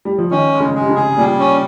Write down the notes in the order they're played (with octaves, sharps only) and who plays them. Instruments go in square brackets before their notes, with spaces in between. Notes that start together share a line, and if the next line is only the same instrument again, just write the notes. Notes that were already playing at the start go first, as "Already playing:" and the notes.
[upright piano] G3
F3
[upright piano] D#3 [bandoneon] C#4
[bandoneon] G#3
[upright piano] C#3
[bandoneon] G#3
[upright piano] C3
C#3
[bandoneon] G#4
[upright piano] A#2 [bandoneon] G3
[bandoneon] C#4